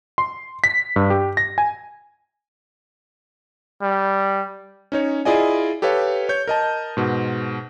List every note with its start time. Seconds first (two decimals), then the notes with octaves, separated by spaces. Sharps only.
0.18 C6
0.64 B6
0.96 G2
1.10 G4
1.37 A#6
1.58 G#5
3.82 G3
4.92 C#4 D#4 C#5
5.25 E4 F4 G#4 D5 D#5 G#5
5.82 G4 A4 B4 C#5 F5
6.29 C#5 G6
6.48 A#4 D#5 A5
6.97 G#2 B2